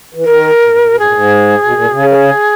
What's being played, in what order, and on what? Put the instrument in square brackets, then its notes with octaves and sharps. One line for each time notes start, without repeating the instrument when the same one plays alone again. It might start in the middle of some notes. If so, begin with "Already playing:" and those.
[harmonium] E3
[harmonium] D#3 [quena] A#4
[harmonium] A#2
G#2
A#2
B2
[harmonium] G#2 [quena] G#4
[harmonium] A#2
G#2
B2
A#2
B2
C#3
[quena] A#4
G#4